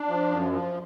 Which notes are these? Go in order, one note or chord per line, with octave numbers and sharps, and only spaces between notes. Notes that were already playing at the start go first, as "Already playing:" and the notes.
Already playing: D4
F3
F#2
F3